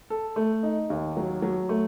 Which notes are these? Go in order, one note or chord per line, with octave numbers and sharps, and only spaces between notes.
A4
A3
D#4
D#2
F#3
F#3
A3